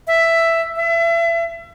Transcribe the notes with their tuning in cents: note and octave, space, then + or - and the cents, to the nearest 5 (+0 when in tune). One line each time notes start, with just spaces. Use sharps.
E5 +5
E5 +30